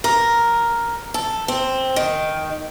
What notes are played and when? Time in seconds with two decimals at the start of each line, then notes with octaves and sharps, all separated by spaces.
0.04 A#4
1.14 A4
1.48 C4
1.96 D#3